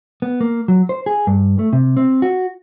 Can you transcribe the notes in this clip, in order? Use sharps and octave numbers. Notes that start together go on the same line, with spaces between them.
B3
A#3
F#3
C5
G#4
G2
A3
C3
C4
F#4